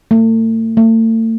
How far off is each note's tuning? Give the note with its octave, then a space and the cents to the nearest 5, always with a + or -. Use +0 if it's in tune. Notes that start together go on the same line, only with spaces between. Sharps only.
A3 +40
A3 +40